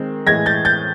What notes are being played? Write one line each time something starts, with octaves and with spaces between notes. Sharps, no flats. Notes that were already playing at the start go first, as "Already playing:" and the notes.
Already playing: D#3 G#3 C4
A2 E3 G#3 G#6 A#6
G6 A6
G6 A6